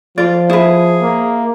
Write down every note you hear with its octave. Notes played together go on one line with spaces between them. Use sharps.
F3 F4 D5
E4 G#4 B4
A#3